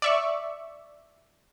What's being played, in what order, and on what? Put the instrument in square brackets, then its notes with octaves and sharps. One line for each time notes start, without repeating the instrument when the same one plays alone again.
[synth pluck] D5 E5 C#6